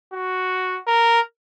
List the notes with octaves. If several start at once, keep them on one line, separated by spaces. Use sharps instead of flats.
F#4
A#4